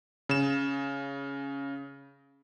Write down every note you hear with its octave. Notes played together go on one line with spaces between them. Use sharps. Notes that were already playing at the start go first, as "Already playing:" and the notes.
C#3 E7